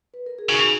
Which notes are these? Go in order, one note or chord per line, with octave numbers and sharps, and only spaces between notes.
B4
A#4
G#4
C#3 D#4 F#4